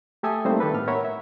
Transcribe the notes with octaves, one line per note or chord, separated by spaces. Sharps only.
A3 G4 A4 E5 G#5 D#6
G3 A3 A#3 C4 D#4 C5
D#3 G4 A4 B4
A2 B3 F6
A#4 C#5 E5 F#5 B5
E5